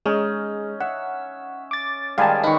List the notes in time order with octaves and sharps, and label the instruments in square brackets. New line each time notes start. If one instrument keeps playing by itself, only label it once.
[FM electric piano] G#3 [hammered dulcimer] C#4 D#4
[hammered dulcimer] E5 [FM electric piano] F#5
[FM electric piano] D6 A6
[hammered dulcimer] D#3 G3 G#3 [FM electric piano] F5 G#5 A5
[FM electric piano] D#3 D#4 [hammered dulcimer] B4 C#6